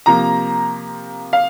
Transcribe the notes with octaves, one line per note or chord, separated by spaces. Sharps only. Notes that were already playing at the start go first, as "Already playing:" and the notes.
C3 F3 A#3 A#5
F5